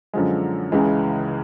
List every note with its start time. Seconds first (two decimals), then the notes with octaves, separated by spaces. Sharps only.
0.13 F#2 D3 F3 G#3
0.72 C#2 C#3 E3 G#3